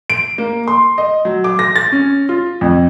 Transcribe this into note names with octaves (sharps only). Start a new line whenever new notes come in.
D7
A#3
C6
D#5
F#3
D6
A#6
A6
C#4
F4
F2